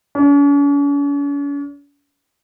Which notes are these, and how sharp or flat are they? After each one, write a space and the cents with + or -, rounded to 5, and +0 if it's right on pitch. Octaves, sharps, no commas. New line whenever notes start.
C#4 +45